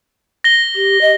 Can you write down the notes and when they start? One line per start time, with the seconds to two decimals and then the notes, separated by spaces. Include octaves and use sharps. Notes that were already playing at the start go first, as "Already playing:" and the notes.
0.44 A#6 G7
0.75 G4
1.01 D#5